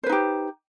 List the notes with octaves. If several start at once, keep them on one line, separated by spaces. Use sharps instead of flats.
D#4 G4 B4 C5